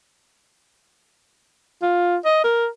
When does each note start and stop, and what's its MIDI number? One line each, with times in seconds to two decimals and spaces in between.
1.82 2.17 65
2.25 2.40 75
2.44 2.67 70